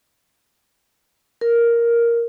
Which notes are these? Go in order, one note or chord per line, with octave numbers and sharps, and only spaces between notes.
A#4